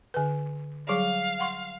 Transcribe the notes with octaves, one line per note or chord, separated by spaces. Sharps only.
D3 B4
F#3 G3 G#4 F5
F#5 C6 C#6